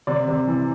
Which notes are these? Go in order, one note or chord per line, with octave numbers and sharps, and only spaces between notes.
C3 D5
C3
E3